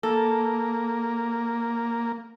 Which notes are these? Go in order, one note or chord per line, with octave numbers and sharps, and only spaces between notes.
A#3 A4